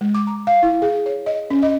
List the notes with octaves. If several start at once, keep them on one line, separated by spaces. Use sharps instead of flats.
G#3
D6
A#5
F5
E4
G#4
C#5
D#5
C#4
D#5